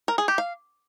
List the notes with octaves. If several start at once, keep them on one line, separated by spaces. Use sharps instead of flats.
A#4
G#4
G4
F5